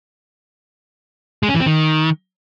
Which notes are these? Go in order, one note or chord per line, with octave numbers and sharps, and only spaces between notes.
G#3
C#4
E3
C4
D#3